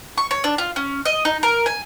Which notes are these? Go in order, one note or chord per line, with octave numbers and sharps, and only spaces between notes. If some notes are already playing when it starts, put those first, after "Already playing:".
C#6
C#5
D4
F4
C#4
D#5
D#4
A#4
G#5